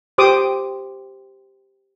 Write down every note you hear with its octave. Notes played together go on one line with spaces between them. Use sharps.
G4 C5 D6 D#6